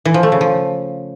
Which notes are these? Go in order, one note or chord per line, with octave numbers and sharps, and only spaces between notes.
E3
F3
A3
C#3
F3